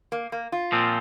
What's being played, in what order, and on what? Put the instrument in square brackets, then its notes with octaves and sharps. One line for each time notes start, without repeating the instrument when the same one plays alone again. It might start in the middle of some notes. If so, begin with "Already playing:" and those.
[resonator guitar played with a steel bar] A#3
A#3
F4
[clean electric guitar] A#2 F3 C4